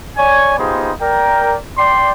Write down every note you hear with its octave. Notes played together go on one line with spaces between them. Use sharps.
C#5 D5 G#5
B3 D#4 F4 G4 G#4 C5
A#4 D5 G5
D5 G5 C6